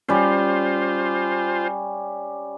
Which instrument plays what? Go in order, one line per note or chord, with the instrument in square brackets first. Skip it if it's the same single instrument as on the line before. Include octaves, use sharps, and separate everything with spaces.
[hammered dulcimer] G3 C#4 [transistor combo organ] F4 C5